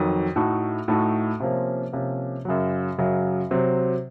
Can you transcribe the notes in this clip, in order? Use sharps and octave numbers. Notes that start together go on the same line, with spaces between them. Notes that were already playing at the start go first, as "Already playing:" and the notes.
Already playing: F2 D#3 F#3
A2 A3 D#4 F#4
A2 A3 D#4 F#4
C3 F3 A#3 C#4
C3 F3 A#3 C#4
F#2 C#3 F#3
F#2 C#3 F#3
C3 F#3 C4